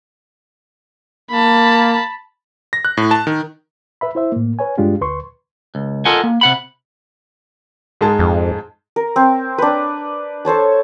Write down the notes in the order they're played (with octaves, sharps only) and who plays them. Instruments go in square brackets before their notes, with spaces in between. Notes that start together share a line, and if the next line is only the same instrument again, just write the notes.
[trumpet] A#3 [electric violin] A5 B5
[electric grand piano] A#6
F#6
A2
A5
D#3
[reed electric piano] B4 E5 B5
E4 C5 E5
A2 A#3
B4 C#5 G#5
G2 G#3 D4 F4 G4
D2 B4 C6 C#6
[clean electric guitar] C#2
F4 A4 A#4 D#5 F#5 G#5
A#3
C3 F#5 B5
[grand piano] G#2 G#3 A5
[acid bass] F2
[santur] A#4
C4
D4 B4
A4 C5 C#5 A5